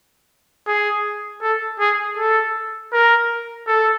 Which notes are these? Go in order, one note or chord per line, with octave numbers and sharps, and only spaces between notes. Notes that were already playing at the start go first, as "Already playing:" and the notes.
G#4
A4
G#4
A4
A#4
A4